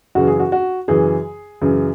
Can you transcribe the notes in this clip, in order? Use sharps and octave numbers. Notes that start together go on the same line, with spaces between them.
F#2 C#3 E3 F#4
G#4
F#4
F#4
F#2 C#3 E3 G#4
F#2 C#3 E3